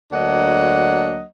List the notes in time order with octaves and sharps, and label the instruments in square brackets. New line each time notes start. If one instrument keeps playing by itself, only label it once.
[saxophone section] D2 F#3 A#3 D4 D#5 F#5